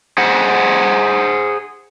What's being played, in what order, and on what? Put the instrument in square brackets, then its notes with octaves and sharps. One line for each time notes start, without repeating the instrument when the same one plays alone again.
[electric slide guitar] G#4 C5 F#5